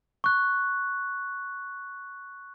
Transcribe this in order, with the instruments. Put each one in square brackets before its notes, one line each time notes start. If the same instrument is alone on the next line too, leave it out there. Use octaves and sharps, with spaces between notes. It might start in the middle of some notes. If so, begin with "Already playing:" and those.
[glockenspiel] C#6 F#6